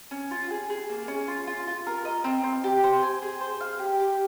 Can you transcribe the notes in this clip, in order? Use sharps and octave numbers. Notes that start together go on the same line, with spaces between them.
C#4
F4
G#4
G#4
A#3
C#4
F4
F4
F4
A#4
D#5
C4
C4
G4
C5
G#5
G#4
C5
F5
G4
G4